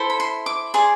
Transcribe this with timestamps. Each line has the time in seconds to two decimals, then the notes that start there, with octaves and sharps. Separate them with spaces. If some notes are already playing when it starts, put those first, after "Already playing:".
Already playing: E4 A4 C5
0.10 B5
0.20 C6
0.46 D6
0.74 G#4 D5 C6